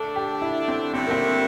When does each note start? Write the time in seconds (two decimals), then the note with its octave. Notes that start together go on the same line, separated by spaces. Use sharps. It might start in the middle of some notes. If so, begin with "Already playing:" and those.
Already playing: D3 A3 D4 A4
0.16 G4
0.42 E4
0.68 C4
0.93 G2 D3 A3 C4 E4 G4
1.07 A#3
1.11 C4